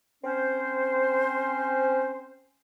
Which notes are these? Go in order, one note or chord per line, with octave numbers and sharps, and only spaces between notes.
C4 C#4 C5